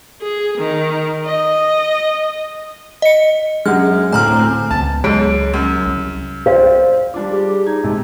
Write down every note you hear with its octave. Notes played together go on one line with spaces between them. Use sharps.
G#4
D#3
D#5
D#5 C#7
F#2 G#3 F6
D2 A2 C4 G#5 A#5 F6
C#2 F#3 B3 A5
C#2 G#2 F#3 B3 G#4 C#5 D7
F#2
C2
C5 D5 F5 G5
G3 D4 F4 D6
G4 G#4
D#4 G#6
A#1 C3 G#3 A5